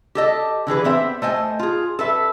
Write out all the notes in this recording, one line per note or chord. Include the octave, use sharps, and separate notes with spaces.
G4 A4 D#5
D3 E3 G#4 B4
B3 C4 E5
A3 C5 D#5 G#5
F4 G#4
A4 B4 E5